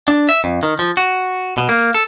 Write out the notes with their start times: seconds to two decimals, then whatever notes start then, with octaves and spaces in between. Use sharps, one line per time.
0.08 D4
0.29 E5
0.44 F2
0.63 D#3
0.79 F3
0.97 F#4
1.58 B2
1.69 A#3
1.94 A4